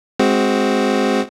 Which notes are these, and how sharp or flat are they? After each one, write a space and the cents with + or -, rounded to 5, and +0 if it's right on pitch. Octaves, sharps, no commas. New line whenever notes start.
G#3 +10 C4 +0 F#4 +0